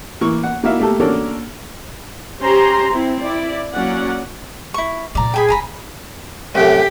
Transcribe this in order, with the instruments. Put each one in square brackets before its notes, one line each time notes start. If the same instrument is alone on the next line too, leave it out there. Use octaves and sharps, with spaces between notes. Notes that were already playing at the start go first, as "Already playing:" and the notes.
[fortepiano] E3 A#3 C#6
F#5
A#3 D#4 E4 F#4 E5 F5
A3 A#3 G4 A4 A5
A#3 C#4 D4 F#4 A4 A#4
[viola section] C#4 G4 C5 G#5 A#5 C6
C4 E4
E4 D5
F#3 A#3 C#4 D5 F#5
[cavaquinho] E4 C#6
[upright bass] A#2 F3 [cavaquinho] D5 A#5
[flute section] G#4 [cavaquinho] G5 G#5 B5
[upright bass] F#1 [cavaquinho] G#5 A#5 B5
[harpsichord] C2 F#2 A2 [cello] G4